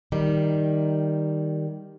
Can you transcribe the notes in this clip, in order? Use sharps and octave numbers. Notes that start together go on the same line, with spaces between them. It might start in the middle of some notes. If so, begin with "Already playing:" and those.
D#3 G3